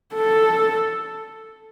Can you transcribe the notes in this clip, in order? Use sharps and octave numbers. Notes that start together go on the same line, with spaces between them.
A4